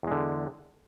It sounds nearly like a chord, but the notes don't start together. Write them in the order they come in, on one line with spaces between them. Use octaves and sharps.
E2 G#3 D3